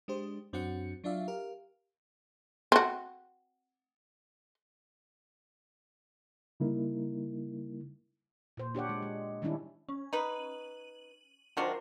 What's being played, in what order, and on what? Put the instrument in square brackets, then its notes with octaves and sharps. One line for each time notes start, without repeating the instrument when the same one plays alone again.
[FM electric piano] G#3 D4 G4 C5
F#2 C4 D4 F#4 F#5 C#7
F#3 D4 F4 D5 E5 F5
G4 A#4 F5
[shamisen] C4 F#4
[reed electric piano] C#3 G3 A#3 D#4 E4 A#4
[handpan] A#2 C5
D4 G4 C#5 F#5
G#3
G#3
D#3 G3 C#4 D4 E4
[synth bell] C#4
[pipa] D#4 B4 [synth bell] D#7 F#7
[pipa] D#3 F#3 D4 [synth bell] F4 A#4 C5